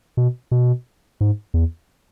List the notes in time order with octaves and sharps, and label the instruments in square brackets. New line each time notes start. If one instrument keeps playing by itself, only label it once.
[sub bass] B2
B2
G#2
E2